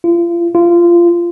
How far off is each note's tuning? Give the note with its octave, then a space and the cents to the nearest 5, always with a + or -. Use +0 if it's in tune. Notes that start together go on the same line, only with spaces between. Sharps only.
F4 -35
F4 -20